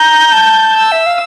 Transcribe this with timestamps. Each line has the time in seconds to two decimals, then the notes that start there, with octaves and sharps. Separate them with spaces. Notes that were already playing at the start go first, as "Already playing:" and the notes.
Already playing: A#5 G6
0.32 A5
0.76 E6
0.92 E5
1.06 F5